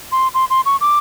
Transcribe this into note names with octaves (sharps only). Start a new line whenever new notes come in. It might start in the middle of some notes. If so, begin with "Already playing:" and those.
C6
C6
C6
C#6
D6